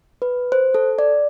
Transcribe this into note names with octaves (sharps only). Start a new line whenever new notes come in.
B4
C5
A4
D5